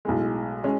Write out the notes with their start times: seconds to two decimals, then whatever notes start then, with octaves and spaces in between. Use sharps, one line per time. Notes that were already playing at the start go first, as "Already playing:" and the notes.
0.05 B1 A2 G#3
0.64 G#3 C#4